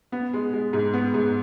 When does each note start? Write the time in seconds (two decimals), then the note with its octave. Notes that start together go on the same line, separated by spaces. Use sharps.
0.12 B3
0.34 G#3
0.53 G#3
0.73 G#2
0.93 B3
1.14 G#2